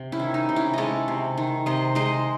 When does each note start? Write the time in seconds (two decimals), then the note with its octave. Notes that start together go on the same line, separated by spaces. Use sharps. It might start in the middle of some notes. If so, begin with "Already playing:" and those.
Already playing: C3
0.12 C#4 E4
0.20 D#3
0.34 D#4
0.49 C3
0.56 C#4 E4
0.74 G#3 A4 C#5 D#5
1.08 C3
1.37 D#3
1.66 C3 C5 D#5
1.95 G#3 C5 D#5